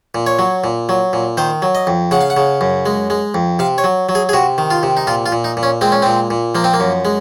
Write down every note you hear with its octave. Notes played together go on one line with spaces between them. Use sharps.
A#2
C#5
F#3
A#2
F#3
A#2
D#3 C5
F#3
D#5
F2
C#3 F#5
F5
F#5
C#3
F#2
G#3
G#3
F2
C3 F5
C#5
F#3
F#3
G#4
G#4
C3 F#4
D#3
F4
C3
D#4
A#2 F4
F4
A#2
D#4
A#2
C#4
G#3 C4
C#4
A#2 C4
A#2
F3 A#3
C4
A#3
F#2
G#3